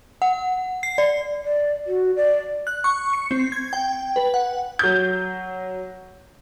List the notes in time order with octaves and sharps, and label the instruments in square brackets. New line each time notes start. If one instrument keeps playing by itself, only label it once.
[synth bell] F#5
C7
D5
[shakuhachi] D5
F#4
D5
[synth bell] F#6
C#6
C#7
C4
G#6
G5
B4
F#5
[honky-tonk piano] F#3 G6